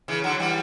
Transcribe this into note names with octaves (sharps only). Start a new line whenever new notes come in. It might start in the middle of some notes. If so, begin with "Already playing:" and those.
C#3 E3
D3 F#3
E3 G3